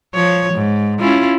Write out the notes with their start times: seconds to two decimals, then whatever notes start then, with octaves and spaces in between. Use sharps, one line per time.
0.14 F3 C#5
0.54 G#2
0.99 C#4 E4 F4